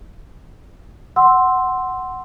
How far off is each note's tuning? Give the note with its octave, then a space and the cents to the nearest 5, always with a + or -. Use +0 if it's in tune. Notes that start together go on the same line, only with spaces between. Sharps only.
F#5 +10 C6 +0 E6 +0